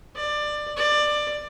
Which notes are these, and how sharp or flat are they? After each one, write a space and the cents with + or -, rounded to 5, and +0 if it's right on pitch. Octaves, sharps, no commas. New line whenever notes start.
D5 +20
D5 +15